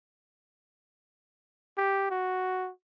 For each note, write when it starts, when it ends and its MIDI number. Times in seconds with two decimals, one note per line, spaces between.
1.78 2.10 67
2.11 2.70 66